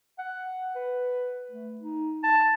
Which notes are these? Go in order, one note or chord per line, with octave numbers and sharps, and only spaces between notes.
F#5
B4
A3
D#4
A5